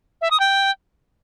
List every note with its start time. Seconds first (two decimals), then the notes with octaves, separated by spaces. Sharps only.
0.21 E5
0.31 D#6
0.40 G5